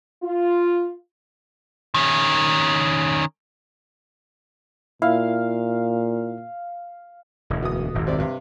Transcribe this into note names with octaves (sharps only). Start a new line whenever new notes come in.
F4
D#3 C#4
A#2 E4 F5
E1 D2
B2 D#6
D#1 G#1 F2
C3 C4 D5
G2 C3